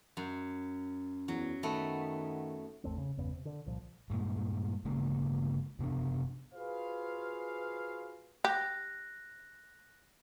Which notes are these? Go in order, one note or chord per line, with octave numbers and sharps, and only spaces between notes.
F#2
E2 F#3
D#3 A3 B3
G#1 E2 A3 C4
C#3
G1 E2 C#3 B3
C3
D3
C2 A#2 F3
G2 A#2 G#3
G1 C#3 G#3 A#3
F#1 C3 B3 D4
F4 F#4 G#4 B4 C5 F5
G4 F#6 A#6